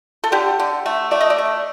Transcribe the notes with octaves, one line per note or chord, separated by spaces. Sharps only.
A4
D3 G4
D3
A3
A3 D5
D#5
D5
A3